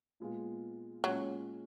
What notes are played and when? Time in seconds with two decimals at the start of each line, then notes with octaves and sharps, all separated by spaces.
0.20 A#2 G#3 B3 F4
1.04 A#2 F#3 G#3 C#4